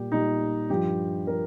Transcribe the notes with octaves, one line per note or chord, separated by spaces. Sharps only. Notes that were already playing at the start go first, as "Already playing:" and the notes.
Already playing: A#2 G3 G4
A#2 G3 D#4
G2 F3 G4
F3 A#4